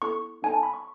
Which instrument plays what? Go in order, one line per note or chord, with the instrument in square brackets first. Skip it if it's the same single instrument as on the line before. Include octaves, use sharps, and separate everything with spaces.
[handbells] B3 E4 A4 C#6
B3 D#4 A4 G#5
A5
B5
C#6